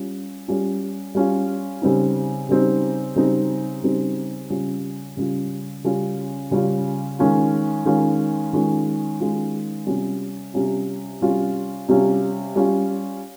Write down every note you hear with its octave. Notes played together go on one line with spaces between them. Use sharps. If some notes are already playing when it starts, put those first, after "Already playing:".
Already playing: G3 C#4 F4
G3 C#4 F4
G3 C#4 F4
C#3 G3 C4 D#4
C#3 G3 C4 D#4
C#3 G3 C4 D#4
C#3 G3 C4 D#4
C#3 G3 C#4 F4
C#3 G3 C#4 F4
C#3 G3 C#4 F4
C#3 G3 C#4 F4
D#3 G#3 C#4 F4
D#3 G#3 C#4 F4
D#3 G#3 C#4 F4
D#3 G#3 C#4 F4
C3 G3 C#4 F4
C3 G3 C#4 F4
C3 G3 C#4 F4
C3 G3 C#4 F4
G3 C#4 F4